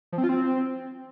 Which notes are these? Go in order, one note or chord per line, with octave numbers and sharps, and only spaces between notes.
F3
C4
F4
C4